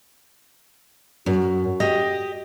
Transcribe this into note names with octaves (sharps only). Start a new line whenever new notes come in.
F#2 F#4
G4 D#5